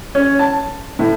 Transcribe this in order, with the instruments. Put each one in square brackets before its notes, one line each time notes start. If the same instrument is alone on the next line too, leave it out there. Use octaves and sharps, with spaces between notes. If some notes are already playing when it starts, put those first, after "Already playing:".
[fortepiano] C#4
A5
A2